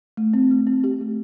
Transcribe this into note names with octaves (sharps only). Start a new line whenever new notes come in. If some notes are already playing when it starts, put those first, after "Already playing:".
A3
C4
A3
C4
G4
A3